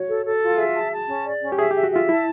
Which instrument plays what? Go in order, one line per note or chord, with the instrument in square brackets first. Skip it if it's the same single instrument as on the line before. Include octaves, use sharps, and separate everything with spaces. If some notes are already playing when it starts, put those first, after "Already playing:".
Already playing: [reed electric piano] F#4 [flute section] C#5
[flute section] A4
A4
F4
[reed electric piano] G#4 [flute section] E5
[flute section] A5
A5
C#4
D5
C#4
[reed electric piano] G4
[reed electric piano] G#4 [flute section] E5
[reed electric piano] G4 [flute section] E5
[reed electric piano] F#4
[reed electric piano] F4 [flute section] E5
[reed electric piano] E4 [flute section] A5